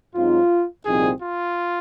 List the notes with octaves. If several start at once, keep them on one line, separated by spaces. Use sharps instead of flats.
G#2 F#3 C4 D#4 F4
C2 A#2 F3 C4 D#4 G#4
F4